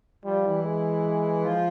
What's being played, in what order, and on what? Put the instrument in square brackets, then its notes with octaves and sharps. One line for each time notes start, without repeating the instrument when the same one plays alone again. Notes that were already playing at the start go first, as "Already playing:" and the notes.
[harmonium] F3 F4 [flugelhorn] G3
[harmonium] E3 E4
[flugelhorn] G#3
[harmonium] F3 F4